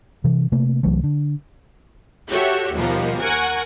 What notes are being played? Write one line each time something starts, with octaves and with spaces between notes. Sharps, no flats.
C3 E3
C3 A3 A#3
C2 E3 F#3 A3
D3
F#4 G4 A4 C#5 E5
D#2 B2 F3 G3 A#3
A#4 F#5 G#5 C#6